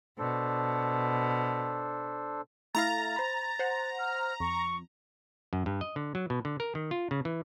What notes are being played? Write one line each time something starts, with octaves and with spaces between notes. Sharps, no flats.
B2 D4 A4 C5
A3 E4 F5 A#5 A6
C5 B5
C5 F#5
F6
F2 C#6
F#2
G2
D#5
D3
F#3
B2
D3
A#4
D#3
F4
C#3
E3